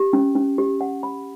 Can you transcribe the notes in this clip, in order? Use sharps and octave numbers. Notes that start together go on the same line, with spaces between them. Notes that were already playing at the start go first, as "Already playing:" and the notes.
Already playing: G4
C#4
C#4
G4
F#5
B5